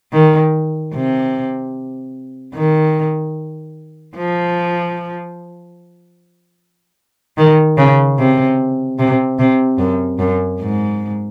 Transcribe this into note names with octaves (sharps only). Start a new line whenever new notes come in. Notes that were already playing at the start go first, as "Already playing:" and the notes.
D#3
C3
D#3
F3
D#3
C#3
C3
C3
C3
F#2
F#2
G#2